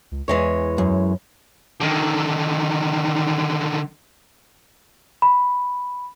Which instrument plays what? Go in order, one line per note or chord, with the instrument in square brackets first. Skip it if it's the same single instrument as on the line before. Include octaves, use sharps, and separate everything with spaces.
[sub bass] C#2
[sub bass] E2 [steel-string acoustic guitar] E3 G#3 C#5
[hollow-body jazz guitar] F#2
[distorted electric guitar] D3 D#3
[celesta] B5